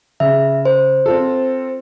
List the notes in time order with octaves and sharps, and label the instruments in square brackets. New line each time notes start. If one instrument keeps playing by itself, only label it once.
[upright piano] C#3 [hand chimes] E5
[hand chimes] C5
[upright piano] C4 F4 A4